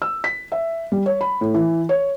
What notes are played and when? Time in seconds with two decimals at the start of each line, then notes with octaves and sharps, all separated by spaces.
0.02 E6
0.24 B6
0.52 E5
0.92 G3
1.06 C#5
1.21 B5
1.41 A2
1.54 E3
1.89 C#5